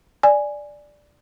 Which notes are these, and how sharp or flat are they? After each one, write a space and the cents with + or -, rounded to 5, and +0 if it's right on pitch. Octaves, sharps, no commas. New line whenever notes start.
D5 +0 G#5 +0